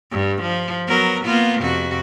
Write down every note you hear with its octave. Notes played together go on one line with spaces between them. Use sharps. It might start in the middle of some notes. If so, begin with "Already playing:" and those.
G2
F3
F#3 B3 A#4
A#3 B3 F4
F2 C3 F#4